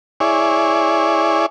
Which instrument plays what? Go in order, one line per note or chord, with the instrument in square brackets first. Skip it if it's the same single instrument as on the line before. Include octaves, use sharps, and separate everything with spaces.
[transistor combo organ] E4 G#4 C#5 D5